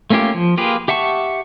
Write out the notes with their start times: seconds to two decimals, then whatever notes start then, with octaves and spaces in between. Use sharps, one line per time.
0.10 A3 A#3 C#4 F4 G4
0.34 F3
0.57 A#3 F4 G4 G#4 B4
0.88 G4 E5 F#5 A5 C#6